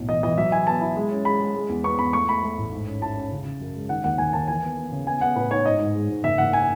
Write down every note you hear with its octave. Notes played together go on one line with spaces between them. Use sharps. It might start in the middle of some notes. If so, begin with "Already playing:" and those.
Already playing: B1 A2
E3 D#5
E3 D#5
F#3 E5
E4 G#5
B3 A5
E4
G#3
C#4
G#3 B5
G#3
G#3
E2
B3 C#6
E2 B5
A3 C#6
A3 B5
A3
A1
G#2
C#4
E4 A5
C#4
C#3
C#3
F#2
G#3
D#3 F#5
D#2 F#5
D#2 G#5
D#2 A5
E3 G#5
B3
B3
C#3
B3 G#5
B3 F#5
A2 B4
D#4 C#5
G#2 D#5
G#2
G#3
G#2
F#1 E5
F#1 F#5
G#5